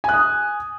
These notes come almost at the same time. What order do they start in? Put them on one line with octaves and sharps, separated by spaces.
G#5 F#6 D#6